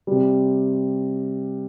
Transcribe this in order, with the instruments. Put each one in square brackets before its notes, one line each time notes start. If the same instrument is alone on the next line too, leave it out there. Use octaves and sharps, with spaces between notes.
[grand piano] C3 G3